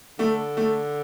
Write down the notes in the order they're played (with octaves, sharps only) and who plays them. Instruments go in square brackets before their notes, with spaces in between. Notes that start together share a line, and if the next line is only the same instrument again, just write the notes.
[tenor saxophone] D3 [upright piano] A3
[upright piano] A3